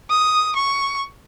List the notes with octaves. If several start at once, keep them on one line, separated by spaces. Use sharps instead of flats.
D#6
C#6